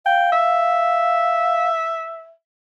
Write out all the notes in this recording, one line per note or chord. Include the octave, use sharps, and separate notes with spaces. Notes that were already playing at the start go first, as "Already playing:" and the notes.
F5 G5
E5